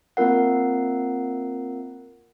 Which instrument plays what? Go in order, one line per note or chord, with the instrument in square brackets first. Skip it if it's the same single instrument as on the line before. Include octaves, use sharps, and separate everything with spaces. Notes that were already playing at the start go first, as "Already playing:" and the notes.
[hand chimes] A#3 C4 F4 A#4 F#5